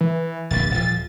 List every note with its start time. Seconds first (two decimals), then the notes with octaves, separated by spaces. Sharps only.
0.01 E3
0.51 D1 A#1 G2 A6
0.71 D#1 A2 F3